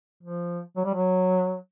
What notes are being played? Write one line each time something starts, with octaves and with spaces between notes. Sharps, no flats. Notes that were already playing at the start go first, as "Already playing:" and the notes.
F3
F#3
G3
F#3